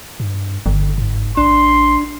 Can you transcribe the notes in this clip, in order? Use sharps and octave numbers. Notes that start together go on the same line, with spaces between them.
G2
G1 D3
G#2
A1 D4 C6